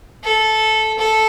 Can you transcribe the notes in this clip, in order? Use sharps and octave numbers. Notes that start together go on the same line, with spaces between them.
A4
A4